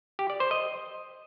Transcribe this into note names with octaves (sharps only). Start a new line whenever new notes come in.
G4
D5
C5
D#5